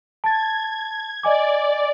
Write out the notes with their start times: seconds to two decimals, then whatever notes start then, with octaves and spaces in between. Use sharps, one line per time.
0.24 A5 G#6 A6
1.23 D5 D#5 G#5 D6